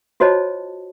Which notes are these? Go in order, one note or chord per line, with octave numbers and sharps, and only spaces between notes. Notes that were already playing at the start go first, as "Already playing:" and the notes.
F4 F#4 C5 C#5 D#5 A5